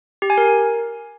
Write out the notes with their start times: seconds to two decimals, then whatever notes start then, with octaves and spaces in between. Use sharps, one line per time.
0.22 G4
0.30 G#5
0.38 A#4